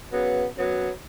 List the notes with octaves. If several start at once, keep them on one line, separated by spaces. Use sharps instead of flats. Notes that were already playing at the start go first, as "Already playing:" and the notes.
C#3 F#3 B3
F#2 F#3 B3